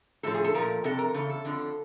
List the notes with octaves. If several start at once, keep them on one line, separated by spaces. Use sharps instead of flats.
A2 F3 A4
G#4
A4
A#2 F3 A#4
F2 C3 A4
A#4
E2 C#3 A4
A4
F2 D3 F3